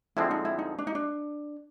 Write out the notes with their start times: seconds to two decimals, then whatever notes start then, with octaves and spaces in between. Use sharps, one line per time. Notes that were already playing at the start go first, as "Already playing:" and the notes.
0.17 F2 D3 F3 G#3 C4 E4
0.31 D#4
0.45 E4
0.59 D#4
0.79 D4
0.87 D#4
0.95 D4